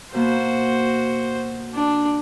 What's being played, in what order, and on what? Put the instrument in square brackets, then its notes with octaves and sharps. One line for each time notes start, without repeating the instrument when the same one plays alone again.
[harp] B2 A#3 B3 [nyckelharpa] F#4 C5
[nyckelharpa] D4